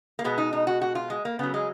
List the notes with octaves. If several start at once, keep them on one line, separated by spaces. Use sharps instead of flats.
A#3
B2 G#3 B3
D#4
D#4
F#4
F#4
F4
G#3
A#3
C#3 F#3 B3
G#3